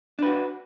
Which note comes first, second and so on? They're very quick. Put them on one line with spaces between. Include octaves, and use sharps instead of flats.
D4 B4 F#4